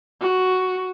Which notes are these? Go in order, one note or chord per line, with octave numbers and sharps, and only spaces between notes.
F#4